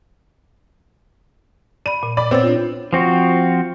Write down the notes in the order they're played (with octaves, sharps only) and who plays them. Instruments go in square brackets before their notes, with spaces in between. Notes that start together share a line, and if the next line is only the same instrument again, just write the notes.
[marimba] D5 B5 [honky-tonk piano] D#7
[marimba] A#2
[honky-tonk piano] D5 B5
[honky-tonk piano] B3 C4 [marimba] C#5 E6 A6
[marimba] D4 F4
[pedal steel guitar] F3 C4 F#4